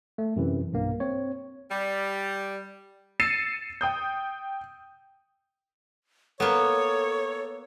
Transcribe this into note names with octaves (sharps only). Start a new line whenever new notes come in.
A3
F#2 C3 E3
B1 G2 A#3
C4 C#5
G3
E6 A6 C7 C#7 D#7 E7
G5 D#6 G6
A#3 B3 A4 C#5